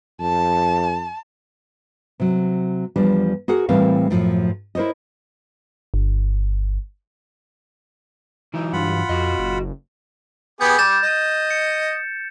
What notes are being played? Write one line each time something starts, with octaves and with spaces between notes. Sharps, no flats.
F2 A5
C3 F#3
E2 F3 G3 D4
F#4 G#4 A#4 F#5
A2 E3 G3 C4 A#4 F5
F#2 A2 F3
E4 A#4 C5 C#5 D#5
G1
E3 F#3 D#4 E4
G2 F4 F#5 B5
F2 F#4 D#5
F#1
B3 G4 G#4 G6
G3 G6 A6 E7
D#5
C#7